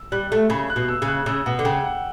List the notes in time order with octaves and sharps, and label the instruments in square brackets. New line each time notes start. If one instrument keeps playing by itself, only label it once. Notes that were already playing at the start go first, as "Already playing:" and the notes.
Already playing: [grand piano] E6
[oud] G3 [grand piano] F#6
[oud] A3
[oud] C#3 [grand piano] B5
[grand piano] F#6
[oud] B2
[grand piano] E6
[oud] C#3
[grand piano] F#6
[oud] C#3 [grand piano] E6
[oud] B2 [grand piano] F#5
[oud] D3
[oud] C#3 [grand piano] G5
[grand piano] F#5